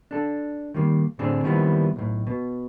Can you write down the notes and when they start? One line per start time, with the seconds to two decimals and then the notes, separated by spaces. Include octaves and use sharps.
0.11 D4 A4
0.74 D#3 G3 A#3
1.19 A2 D3 C4 D4 G#4
1.44 D#3 F3 G3 A#3 B3 E4
1.96 B1 A2
2.27 B2